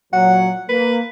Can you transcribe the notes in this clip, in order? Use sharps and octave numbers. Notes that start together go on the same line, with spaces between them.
A#2 F#3 F#5
A#3 B4